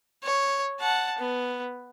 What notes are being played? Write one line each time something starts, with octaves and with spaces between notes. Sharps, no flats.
C#5
F#5 A5
B3